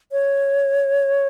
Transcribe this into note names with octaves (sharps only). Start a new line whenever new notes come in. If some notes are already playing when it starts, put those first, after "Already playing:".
C#5